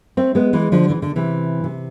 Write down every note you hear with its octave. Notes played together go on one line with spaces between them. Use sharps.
A3 C4
G#3 B3
E3 G#3
D3 F3
E3
D3
C3 E3
C3